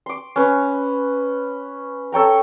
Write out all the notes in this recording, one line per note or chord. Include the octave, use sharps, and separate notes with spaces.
C6 D6
C#4 B4
A4 C#5 G5 A#5